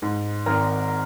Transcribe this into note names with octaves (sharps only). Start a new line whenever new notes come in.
G#2
G#1 A#4